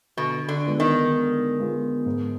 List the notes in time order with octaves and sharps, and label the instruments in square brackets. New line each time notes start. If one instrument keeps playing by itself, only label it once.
[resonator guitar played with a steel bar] B2 [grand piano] D3
[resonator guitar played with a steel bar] D3
[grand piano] G#3 B3 F4 G#4
[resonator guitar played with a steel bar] D#3
[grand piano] D3
G#3 B3 F4 G#4
G#2